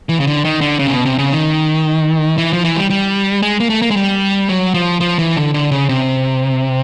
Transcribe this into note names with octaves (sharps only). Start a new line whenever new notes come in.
E3
C#3
D3
D#3
D3
C#3
C3
B2
C3
C#3
D#3
E3
F3
E3
G3
G3
G#3
A#3
A3
A#3
G#3
G3
F#3
F3
F3
E3
D3
D3
C#3
C3